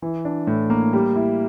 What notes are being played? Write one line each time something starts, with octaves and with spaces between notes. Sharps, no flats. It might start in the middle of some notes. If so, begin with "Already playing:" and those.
E3
D4
A2
A#3
G3
E4